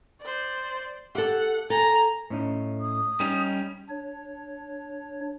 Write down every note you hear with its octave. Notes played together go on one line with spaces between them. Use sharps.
C5 D5
G4 A4 F#5
A4 G#5 A#5
A2 C#4 D#4
D#6
G3 C#4 D#4
D4 C#5